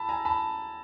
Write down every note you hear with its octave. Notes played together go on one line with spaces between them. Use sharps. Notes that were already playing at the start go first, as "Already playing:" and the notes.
Already playing: A5 B5 E6
G#5 A#5
A5 B5